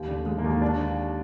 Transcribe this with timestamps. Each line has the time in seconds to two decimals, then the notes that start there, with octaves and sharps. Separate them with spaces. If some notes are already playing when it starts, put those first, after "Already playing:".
Already playing: D#2 G4
0.08 D3
0.26 D#2 G#3
0.38 A#3
0.44 D#2
0.62 D4